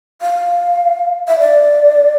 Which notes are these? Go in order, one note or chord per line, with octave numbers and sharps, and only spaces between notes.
F5
E5
D5